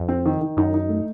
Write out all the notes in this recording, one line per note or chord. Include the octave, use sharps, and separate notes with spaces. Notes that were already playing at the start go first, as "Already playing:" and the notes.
Already playing: F2
C4
D#3
D#3
F#2 D#4
D#4
A3